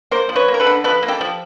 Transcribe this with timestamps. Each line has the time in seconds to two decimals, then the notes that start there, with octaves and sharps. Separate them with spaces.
0.11 A#3 A#4 C5
0.29 F3
0.36 B4 C#5
0.48 A#3
0.54 A#4
0.60 A4 B4
0.67 D3
0.84 F3 A4 B4
1.03 A#3
1.08 G4 A4
1.21 F3